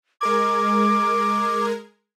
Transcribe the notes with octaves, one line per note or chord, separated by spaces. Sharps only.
G#3 A#4 D6 G#6